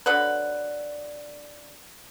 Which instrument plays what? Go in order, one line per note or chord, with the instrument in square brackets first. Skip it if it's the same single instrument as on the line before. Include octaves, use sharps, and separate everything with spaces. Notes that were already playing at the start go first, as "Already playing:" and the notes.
[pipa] D3 F#3 B4